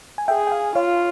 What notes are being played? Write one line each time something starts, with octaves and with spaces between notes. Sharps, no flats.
G#5
G#4 E5 G5
G5
F5 G#5
F4 C#5 F5